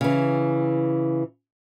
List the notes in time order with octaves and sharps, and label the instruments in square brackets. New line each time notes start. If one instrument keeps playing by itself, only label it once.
[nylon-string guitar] C#3 E3